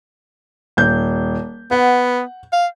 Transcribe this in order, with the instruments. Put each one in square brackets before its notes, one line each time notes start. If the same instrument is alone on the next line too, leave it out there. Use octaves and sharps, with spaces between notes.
[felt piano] D#1 G6
[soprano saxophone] B3 [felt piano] F#5
[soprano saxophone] F5